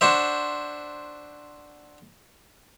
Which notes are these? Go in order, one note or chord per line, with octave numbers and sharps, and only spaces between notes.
D4 F#4 C5 E5